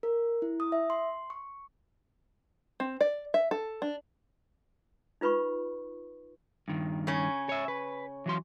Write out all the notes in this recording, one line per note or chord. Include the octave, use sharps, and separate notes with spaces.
A#4
E4
D#6
E5
C6
C#6
C4
D5
E5
A4
D4
D#4 F4 B4 B5 C#6
G2 D#3
C#3 C#4
C#5 E5
B4
E3 F#3 C6